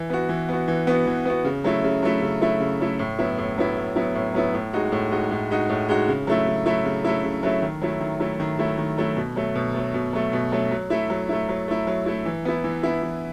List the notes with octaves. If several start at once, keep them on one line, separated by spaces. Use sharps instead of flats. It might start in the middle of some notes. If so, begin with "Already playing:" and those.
Already playing: E3
B3 F#4
E3
B3 F#4
E3
B3 F#4
E3
B3 F#4
C#3
F#3 A3 E4
C#3
F#3 A3 E4
C#3
F#3 A3 E4
C#3
F#3 A3 E4
A2
F#3 B3 E4
A2
F#3 B3 E4
A2
F#3 B3 E4
A2
F#3 B3 E4
A2
G#3 D#4 F#4
A2
G#3 D#4 F#4
A2
G#3 D#4 F#4
A2
G#3 D#4 F#4
C#3
F#3 A3 E4
C#3
F#3 A3 E4
C#3
F#3 A3 E4
C#3
F#3 A3 E4
D#3
F#3 A3 E4
D#3
F#3 A3 E4
D#3
F#3 A3 E4
D#3
F#3 A3 E4
B2
F#3 A3
B2
F#3 A3
B2
F#3 A3
B2
F#3 A3
F#3
A3 E4
F#3
A3 E4
F#3
A3 E4
F#3
A3 E4
E3
B3 E4
E3
B3 E4
E3